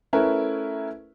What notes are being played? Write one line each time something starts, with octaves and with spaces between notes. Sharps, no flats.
A3 C#4 E4 A#4 B4